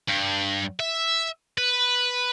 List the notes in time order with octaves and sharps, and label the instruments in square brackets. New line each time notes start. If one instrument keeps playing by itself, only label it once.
[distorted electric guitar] G2
E5
B4